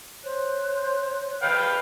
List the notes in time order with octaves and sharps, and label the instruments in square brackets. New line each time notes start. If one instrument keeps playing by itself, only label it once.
[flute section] C5 C#5 F#6
[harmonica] B4 F5 G5